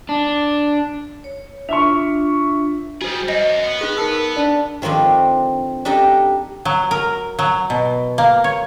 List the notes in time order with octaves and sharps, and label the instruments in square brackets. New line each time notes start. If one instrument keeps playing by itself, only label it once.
[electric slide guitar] D4
[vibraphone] C#5
[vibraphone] D4 F4 [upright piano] E5 C#6
[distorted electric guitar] G3 G#4 [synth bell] F#4 C5
[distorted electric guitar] F#2 [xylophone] D#5
[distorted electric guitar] B3
[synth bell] D#4 G#4 F#6
A#4 A5 E6
[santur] D4
[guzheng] D#3 F3 A3 C4 D4
D4 D#4 G4 A4 D#5
[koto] F#3
A#4
F#3
B2
A#3
C#5